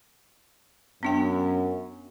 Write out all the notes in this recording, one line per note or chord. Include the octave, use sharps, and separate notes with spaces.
F#2 B3 D4 G5